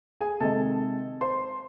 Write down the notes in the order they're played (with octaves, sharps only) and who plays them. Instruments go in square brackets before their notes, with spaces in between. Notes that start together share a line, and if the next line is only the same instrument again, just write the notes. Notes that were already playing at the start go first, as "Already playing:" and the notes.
[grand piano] G#4 G#5
C3 D#3 G#3 A4 A5
C5 C6